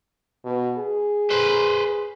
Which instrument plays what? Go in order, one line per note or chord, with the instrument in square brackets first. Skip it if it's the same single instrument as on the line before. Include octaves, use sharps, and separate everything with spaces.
[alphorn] B2
G#4
[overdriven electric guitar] B4 C5